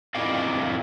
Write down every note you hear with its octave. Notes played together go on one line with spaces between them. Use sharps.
C4 E4 F4 D5 D#5 F5